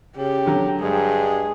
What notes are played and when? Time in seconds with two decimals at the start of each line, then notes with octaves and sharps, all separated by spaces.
0.17 C#3 G4
0.46 D3 F#3 A#5
0.81 G2 G#3 G#4